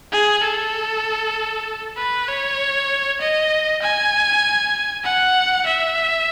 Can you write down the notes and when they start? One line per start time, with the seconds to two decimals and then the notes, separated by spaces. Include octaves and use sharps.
0.13 G#4
0.44 A4
1.97 B4
2.28 C#5
3.21 D#5
3.82 G#5
5.05 F#5
5.67 E5